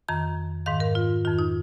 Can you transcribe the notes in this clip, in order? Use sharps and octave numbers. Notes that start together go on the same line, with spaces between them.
F2 D#3 A#5
G#2 D#3 F5
A#4
F4
F2 D#3 F4
D#4